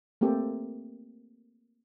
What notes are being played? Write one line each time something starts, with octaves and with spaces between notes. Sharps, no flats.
A3 A#3 C4 G4 A4